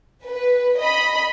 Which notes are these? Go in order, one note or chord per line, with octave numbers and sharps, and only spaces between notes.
B4
D#5 B5